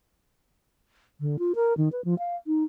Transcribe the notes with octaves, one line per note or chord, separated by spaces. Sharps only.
D3
F4
A#4
D#3
B4
F3
F5
D#4